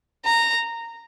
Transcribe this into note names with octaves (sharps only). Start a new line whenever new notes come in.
A#5